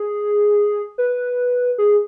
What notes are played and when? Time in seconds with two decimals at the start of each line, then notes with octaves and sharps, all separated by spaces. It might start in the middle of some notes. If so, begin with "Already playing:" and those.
Already playing: G#4
0.98 B4
1.78 G#4